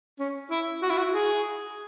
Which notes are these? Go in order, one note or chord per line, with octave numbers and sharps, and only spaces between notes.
C#4
E4
F#4
E4
F#4
G#4